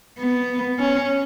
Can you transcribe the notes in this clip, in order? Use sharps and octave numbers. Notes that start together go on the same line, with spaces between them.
B3
C#4